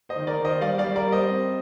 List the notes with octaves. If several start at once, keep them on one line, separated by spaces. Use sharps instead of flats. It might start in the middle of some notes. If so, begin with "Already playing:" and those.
C5 D#5
D#3
A#4 D5
D#3
C5 D#5
G3 D5 F5
D5 F5
G3
A#4 D5
G3
C5 D#5
C4